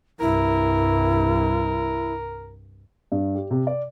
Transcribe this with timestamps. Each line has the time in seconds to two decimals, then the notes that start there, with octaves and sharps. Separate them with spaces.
0.20 C2 G2 E4 A#4
3.12 G2
3.35 G4
3.51 C3
3.67 D5